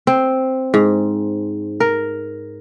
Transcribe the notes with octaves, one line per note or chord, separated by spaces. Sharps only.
C4
G#2
A#4